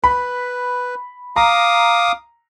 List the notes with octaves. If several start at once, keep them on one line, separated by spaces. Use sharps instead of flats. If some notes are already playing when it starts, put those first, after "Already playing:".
B4 B5
F5 A#5 D6 D#6